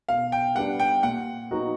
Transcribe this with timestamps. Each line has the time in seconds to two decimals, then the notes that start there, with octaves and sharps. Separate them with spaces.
0.09 B2 F5
0.32 G5
0.55 G3 B3 D4 F#5
0.80 G5
1.03 A#2 F#5
1.51 F#3 B3 D#4 F#4